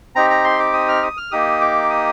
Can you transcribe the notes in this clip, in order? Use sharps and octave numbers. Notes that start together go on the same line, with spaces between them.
C4 D#4 G4 A#5
A#5
C6
D6
D#6
F6
D#6
F6
A#3 D#4 G4 D#6
D6
D#6